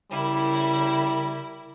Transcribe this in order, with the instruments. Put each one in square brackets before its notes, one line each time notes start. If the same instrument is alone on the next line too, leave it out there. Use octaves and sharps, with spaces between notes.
[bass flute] C#3 [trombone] G3 [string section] E4 A#4